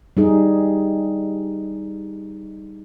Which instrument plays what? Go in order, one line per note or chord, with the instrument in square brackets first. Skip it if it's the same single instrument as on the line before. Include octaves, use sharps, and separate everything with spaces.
[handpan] G3 D#4 G#4